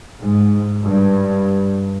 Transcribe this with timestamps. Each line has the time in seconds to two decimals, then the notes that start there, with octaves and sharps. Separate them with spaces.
0.21 G#2
0.84 G2